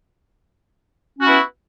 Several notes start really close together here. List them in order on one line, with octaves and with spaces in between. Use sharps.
C#4 F#4 E4 B3